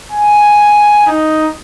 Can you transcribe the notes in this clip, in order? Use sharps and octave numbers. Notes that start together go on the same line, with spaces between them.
G#5
D#4